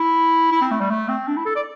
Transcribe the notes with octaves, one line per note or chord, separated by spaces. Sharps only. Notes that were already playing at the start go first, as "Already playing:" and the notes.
Already playing: E4
E4
C4
A3
G3
A3
C4
D4
E4
A4
D5